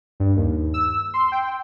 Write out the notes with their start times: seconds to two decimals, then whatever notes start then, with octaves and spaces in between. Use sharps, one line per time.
0.20 G2
0.36 D#2
0.74 E6
1.14 C6
1.32 G5